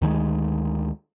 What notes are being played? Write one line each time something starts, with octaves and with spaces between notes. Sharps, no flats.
D2 D#3 E3 G#3